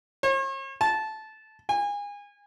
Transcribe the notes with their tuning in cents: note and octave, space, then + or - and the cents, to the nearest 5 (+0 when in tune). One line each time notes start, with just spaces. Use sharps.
C#5 -45
A5 -15
G#5 -30